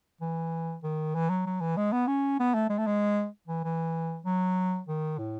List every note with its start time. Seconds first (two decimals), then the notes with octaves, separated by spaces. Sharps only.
0.21 E3
0.83 D#3
1.15 E3
1.30 F#3
1.46 F#3
1.61 E3
1.77 G#3
1.93 B3
2.07 C#4
2.39 B3
2.54 A3
2.70 G#3
2.78 A3
2.87 G#3
3.47 E3
3.64 E3
4.25 F#3
4.88 D#3
5.18 A2